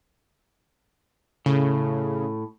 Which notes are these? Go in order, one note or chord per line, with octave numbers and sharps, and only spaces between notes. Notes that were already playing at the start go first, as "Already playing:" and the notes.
A2 C#3